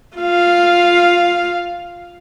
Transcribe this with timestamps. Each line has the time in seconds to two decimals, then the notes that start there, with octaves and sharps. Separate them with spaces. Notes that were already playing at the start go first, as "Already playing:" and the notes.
0.17 F4 F5